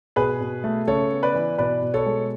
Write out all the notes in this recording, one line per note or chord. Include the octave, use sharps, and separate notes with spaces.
B2 G#4 B4
B2
A3
C#3 A4 C#5
B3
B4 D5
E3
B2 B4 D5
B2
A4 C#5
G#3